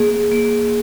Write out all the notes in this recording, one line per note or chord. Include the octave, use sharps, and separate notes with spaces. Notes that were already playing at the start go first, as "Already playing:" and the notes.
Already playing: A#3 G#4
A#3